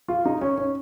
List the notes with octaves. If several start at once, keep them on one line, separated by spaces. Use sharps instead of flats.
F4
D#4
C#4
C#4